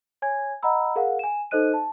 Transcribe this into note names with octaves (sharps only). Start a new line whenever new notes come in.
C#5 G#5 G#6
D#5 F#5 A#5 B5 E6
G#4 A#4 F5 F#5
G#5 E7
D#4 A4 C5 D#5 F#6 D#7
A5